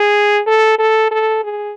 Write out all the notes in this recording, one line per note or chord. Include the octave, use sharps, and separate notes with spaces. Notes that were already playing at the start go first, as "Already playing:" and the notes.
Already playing: G#4
A4
A4
A4
G#4